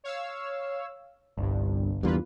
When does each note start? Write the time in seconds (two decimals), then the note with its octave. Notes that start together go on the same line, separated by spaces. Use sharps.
0.04 C#5 F5 E6
1.38 G1 C2 G2
2.03 E2 G2 A#3 F4 B4